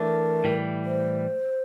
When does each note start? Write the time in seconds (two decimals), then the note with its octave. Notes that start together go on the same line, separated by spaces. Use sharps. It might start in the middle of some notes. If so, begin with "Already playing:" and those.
Already playing: E3 A3 D4 A#4
0.44 A2 E3 G3
0.85 C5